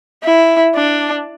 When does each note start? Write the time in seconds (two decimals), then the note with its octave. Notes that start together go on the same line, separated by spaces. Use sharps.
0.24 E4
0.75 D4